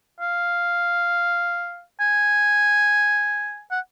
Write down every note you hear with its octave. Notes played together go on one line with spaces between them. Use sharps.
F5
G#5
F#5